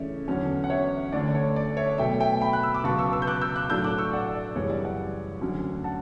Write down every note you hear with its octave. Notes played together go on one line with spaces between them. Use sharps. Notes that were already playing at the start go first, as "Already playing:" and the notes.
Already playing: C#3 E3 A3 C#4 C#5 D5 E5
E2 D3 F#3 C#4
F#5
C#5 E5
D2 D3 A3 D4 D5
C#5
D5
C#5 E5
B2 F#3 A3 E5 G5
E5 G5
G5 B5
F#6
E6
D6
C#2 B2 F#3 B3 A5 C#6
C#6 E6
C#6 E6
G6
D6 F#6
E6 G6
D6 F#6
A2 F#3 A3 D4 E6 G6
D6 F#6
C#6 E6
D5 F#5
D5
F#2 C#3 E3 G3 C#4 C#5
D5
D5 F#5
D2 D3 F#3 C#4
F#5 A5